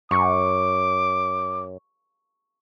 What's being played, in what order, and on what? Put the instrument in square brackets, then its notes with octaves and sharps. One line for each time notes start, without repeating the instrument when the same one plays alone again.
[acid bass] F#2 [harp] C#6 [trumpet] D6